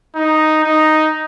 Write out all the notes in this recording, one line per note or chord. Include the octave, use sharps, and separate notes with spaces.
D#4
D#4